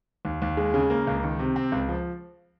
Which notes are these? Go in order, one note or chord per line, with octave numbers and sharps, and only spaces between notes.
D#2
D#2
G#3
C#3
A#3
C#2
D#3
C3
C4
C#2
F3